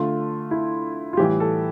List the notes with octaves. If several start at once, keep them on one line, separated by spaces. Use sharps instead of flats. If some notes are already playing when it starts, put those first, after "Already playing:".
Already playing: D3 A3 F4
E4
F4
A2 E3 G3 G4
A4